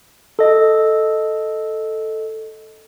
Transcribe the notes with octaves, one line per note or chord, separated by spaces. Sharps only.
A4 D#5